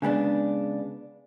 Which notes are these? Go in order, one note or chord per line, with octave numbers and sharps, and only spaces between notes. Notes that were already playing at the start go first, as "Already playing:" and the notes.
C#3 G#3 B3 D4